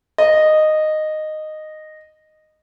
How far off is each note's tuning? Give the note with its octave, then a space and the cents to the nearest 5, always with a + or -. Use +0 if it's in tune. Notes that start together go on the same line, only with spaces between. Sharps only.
D#5 -10